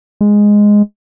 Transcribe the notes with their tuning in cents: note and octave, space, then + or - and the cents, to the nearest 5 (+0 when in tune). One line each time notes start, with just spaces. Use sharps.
G#3 -5